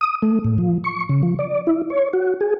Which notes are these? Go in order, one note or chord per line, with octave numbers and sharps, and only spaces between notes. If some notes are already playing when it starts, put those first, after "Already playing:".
D#6
A3
A2
F3
C#6
C#3
F3
D5
E4
C#5
F#4
G#4